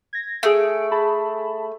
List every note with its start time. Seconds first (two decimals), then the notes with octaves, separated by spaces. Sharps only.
0.13 G#6 A#6
0.43 A3 G#4 D7
0.91 G#4 A5 B5